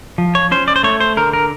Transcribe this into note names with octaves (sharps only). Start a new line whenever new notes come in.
F3
C#5
C#4 C5
D5
C5
A3 C#5
C5
D3 A#4
A#4